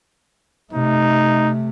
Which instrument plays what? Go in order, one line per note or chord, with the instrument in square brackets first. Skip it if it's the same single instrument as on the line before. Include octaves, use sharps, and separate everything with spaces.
[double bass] C3 A3 [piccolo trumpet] D#4